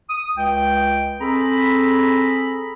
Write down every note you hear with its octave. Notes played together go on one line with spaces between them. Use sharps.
D#6
C#2 G5
C4 G#4 A4 A#5 B5